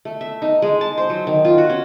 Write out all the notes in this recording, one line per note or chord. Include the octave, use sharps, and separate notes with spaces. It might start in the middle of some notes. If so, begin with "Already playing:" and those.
A3
E5
D#4
G#3
A5
C5
F#3
D#3
F4
F#4
C#4